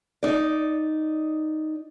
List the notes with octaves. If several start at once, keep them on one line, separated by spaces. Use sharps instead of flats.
D#4 D5